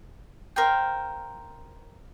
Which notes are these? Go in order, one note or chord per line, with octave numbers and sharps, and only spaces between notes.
A#4 C5 F5 G5